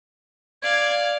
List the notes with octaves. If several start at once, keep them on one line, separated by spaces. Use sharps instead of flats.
D5 F5 G#6